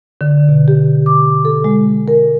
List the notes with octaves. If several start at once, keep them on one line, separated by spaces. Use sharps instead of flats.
D3
B2
G4
D6
A4
G#3
A#4